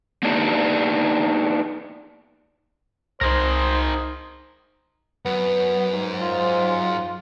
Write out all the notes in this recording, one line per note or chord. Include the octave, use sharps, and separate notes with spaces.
A#3 B3 D4 D#4 G4 D5
C2 D#4 G#4 A#4 C5 A#6
F#2 B3
G#2
F4